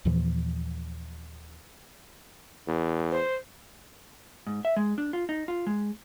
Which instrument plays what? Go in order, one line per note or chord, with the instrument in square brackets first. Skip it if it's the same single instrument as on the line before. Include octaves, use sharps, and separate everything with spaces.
[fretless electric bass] D#2 A#2 E3 F3
[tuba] E2
[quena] C5
[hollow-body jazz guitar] G#2
E5
G#3
D4
F4
D#4
F4
G#3